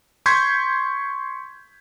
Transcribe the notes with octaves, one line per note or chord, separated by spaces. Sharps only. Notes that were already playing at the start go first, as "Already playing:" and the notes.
C6 C#6 G6 G#6 B6